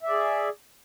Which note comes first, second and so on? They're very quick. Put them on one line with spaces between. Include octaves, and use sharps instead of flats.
E5 D5 G#4